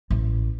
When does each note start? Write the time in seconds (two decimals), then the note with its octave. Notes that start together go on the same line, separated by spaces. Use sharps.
0.10 A1